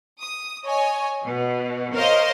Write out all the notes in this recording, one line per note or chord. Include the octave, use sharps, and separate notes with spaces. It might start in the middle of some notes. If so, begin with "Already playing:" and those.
D#6
C#5 D#5 G#5
B2
A#4 C5 C#5 D#5 F5 C6